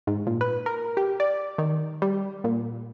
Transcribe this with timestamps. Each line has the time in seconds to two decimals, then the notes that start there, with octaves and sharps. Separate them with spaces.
0.07 G#2
0.27 A#2
0.41 B4
0.66 A#4
0.97 G4
1.20 D5
1.58 D#3
2.02 G3
2.44 A#2